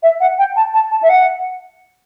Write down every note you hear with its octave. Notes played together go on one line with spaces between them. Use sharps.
E5
F#5
G5
A5
A5
A5
E5
F#5